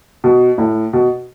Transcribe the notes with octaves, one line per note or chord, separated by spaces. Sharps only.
B2
A2
B2